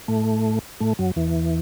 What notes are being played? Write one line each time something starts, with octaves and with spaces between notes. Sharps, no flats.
A2 A3
A2 A3
F#2 F#3
E2 E3